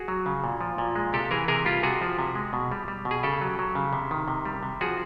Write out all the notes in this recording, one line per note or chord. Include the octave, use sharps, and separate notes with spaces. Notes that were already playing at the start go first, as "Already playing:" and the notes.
Already playing: F#4 G#4
F#3
C#3
A#2
F3
A#2
G#3
C3 G4 A4
E3 G#4 A#4
C3 G#4 A#4
G3 F4 G4
C3 F#4 G#4
F3
C3
G#3
B2
G3
G3
B2
G#4
C#3 G4 A4
F#3
F#3
C#3
C3
D#3
C3
G3
C3
F3 F#4 G#4